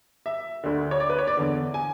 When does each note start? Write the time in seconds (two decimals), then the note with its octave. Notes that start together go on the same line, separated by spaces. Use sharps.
0.26 E5
0.63 D2 D3
0.91 C#5
1.00 D5
1.10 B4
1.18 C#5
1.27 D5
1.37 E2 D3
1.74 G#5